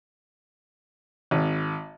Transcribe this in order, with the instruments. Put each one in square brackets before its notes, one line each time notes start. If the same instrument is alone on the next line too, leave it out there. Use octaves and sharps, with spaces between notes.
[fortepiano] G#1